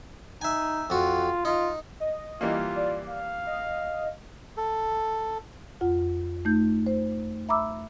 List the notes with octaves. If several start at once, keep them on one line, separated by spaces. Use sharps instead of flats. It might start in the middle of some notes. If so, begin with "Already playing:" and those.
D#4 E5 G#5
F2 F4 F#4
D#4 F4
D#5
E3 G3 A#3 F4
D5
F5
D#5
A4
F2 F4 F#5
A3 D#4 G6
C5
E5 A#5 B5 D6 E6